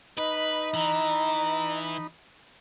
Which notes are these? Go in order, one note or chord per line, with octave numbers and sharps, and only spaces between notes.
D#4 B4 D#5 B5
E3 A#5